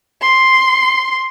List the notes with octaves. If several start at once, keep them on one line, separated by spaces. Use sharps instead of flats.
C6